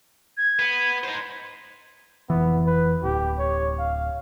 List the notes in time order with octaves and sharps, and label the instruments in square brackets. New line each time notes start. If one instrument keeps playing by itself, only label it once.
[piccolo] G#6
[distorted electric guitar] B3
D#4 C5
[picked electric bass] F1 E3 [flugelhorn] B3
[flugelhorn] B4
[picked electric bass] D1 [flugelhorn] G4
[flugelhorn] C#5
F5